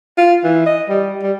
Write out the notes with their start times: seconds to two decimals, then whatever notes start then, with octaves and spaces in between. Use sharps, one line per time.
0.18 F4
0.44 E3
0.66 D#5
0.89 G3
1.23 G3